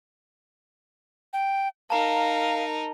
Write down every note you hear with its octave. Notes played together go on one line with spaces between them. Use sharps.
G5
D#4 A#4 F5 A5 A#5